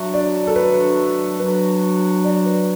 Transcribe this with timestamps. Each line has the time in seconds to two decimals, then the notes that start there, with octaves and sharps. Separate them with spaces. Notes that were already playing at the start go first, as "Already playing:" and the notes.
Already playing: F#3 D4 F#4 E5
0.14 D5
0.47 A4
0.56 B4
1.40 F#3 D4 F#4 B4
2.24 D5
2.45 B4